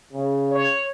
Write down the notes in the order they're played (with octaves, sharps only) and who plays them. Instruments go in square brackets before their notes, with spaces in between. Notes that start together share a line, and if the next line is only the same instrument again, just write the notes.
[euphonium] C#3
[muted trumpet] C#5